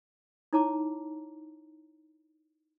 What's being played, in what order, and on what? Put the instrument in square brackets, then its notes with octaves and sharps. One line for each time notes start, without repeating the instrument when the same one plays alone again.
[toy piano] D#4 E4 C#5 A5 A#5 D6